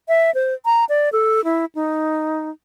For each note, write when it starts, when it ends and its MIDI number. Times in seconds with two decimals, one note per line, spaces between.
0.08 0.33 76
0.34 0.54 72
0.65 0.85 82
0.89 1.09 74
1.12 1.44 69
1.44 1.65 64
1.75 2.50 63